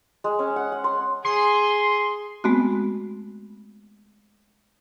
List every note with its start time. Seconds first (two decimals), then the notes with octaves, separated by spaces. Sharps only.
0.24 G#3
0.39 C#4
0.56 F#5
0.72 F#5
0.84 C6
1.25 G#4 C6
2.44 G#3 A3 B3 C4 F#4